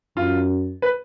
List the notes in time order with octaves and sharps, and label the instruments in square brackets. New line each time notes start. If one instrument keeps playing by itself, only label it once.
[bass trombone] F#2 [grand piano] F4
[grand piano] B4